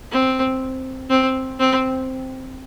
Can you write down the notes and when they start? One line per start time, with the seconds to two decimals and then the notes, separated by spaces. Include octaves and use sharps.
0.11 C4
1.10 C4
1.60 C4